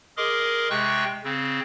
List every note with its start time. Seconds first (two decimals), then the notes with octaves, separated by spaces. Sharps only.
0.17 G#4 A#4 D#5 C6 D6
0.70 C3 G#3 G5 C#6 F#6
1.24 C#3 C4